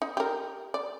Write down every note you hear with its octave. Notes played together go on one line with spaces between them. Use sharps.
D#4
G4 A#4
D5